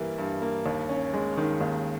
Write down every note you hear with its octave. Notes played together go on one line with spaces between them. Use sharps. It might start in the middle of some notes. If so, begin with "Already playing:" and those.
Already playing: G2 E3 G3 A#3
G2
A#3
D#2
C#4
G#3
D#3
D#2